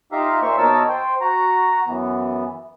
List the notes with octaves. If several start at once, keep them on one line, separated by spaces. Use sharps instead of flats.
D#4 F4 G4 E5 F5 A#5
A#2 A#3 F4 C5 E5 C#6
B2 D#4 A#4 C#5 A5 E6
C5 G5
F#4 A#5
F#2 E3 B3